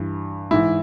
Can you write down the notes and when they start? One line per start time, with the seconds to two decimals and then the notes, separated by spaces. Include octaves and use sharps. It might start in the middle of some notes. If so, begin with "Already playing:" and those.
Already playing: G2 E3
0.51 G#2 E3 E4